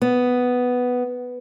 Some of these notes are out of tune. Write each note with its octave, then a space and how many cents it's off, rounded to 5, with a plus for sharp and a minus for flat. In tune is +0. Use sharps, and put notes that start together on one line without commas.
B3 +5